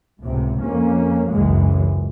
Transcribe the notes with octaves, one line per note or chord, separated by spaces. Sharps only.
C#2 A2 C3
F2 A#3 C#4
G#1 C#2 F#2 E3 G#3